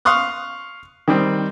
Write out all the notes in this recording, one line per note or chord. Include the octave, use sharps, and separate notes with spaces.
F5 C6 C#6 D#6 F#6
D#3 G3 C4